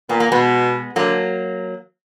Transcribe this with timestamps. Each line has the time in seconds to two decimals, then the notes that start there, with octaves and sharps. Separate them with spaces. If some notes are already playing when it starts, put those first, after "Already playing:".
0.09 A#2 B3
0.20 A#3
0.31 B2 G#3 B3
0.96 D3 F#3 A#3